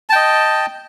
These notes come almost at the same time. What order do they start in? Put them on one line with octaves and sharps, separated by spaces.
A5 G5 D#5